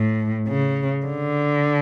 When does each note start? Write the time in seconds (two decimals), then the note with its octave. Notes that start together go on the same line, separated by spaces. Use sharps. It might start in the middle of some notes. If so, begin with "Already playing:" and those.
Already playing: A2
0.48 C#3
1.05 D3